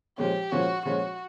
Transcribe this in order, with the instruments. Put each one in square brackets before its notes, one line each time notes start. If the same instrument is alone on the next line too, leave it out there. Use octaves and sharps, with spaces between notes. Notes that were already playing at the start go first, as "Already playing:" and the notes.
[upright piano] A#2 F3 G#3 C#4 [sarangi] G4
[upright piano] A#2 F3 G#3 C#4 [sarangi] F#4
[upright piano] A#2 F3 G#3 C#4 [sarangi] F#4